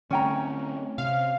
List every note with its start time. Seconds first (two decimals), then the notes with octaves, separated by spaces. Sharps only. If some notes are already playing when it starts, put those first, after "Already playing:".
0.10 D3 A3 C4 C#4 G5 A#5
0.98 C3 F5